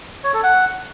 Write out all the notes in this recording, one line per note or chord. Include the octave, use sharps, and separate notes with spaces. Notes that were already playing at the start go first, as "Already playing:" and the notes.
C#5
A4
F#5